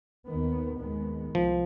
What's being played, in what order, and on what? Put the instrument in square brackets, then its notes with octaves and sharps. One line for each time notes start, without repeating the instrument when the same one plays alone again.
[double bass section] D#2 D#3 B3
D#2 D#3 G#3 B3
[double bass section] C2 [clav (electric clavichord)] F3